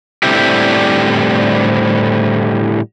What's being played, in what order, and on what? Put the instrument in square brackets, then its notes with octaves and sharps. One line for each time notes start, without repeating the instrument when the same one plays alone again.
[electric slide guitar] A2 D3 G3 C4 E4 G4